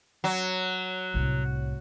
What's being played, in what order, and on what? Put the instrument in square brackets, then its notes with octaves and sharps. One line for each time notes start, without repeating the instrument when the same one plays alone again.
[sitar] F#3
[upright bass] C2 A2